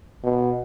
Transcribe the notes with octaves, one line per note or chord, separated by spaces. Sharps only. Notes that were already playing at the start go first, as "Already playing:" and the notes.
B2